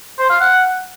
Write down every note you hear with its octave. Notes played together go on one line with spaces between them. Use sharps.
C5
F5
F#5